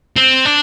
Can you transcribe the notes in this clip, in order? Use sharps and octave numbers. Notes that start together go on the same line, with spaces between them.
C4
D4